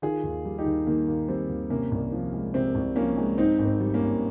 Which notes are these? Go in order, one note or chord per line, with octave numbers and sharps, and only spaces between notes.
D#3 F4 G#4
D#2
G3
D#4 G4
D#2
D#3 A#3
D#2
G3 C4
D#2
C3 A#3 C#4
C2
F3
G#3
C3 C4
C2
F3 A#3 C#4
G#3
G#2 C4 D#4
G#1
C4
G3
A#3 C#4
G#1